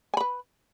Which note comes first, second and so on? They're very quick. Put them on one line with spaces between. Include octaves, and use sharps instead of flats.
G#5 B5 B4